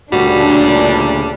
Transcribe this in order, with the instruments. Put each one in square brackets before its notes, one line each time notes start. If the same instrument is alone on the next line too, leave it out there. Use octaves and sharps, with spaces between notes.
[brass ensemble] D2 A#2 C#3 [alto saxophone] G3 [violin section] D4 [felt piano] F#4